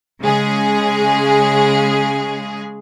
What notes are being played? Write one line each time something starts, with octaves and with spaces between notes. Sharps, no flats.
C#3 G#3 G#4